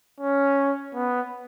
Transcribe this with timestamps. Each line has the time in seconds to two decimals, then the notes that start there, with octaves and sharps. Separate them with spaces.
0.20 C#4
0.95 B3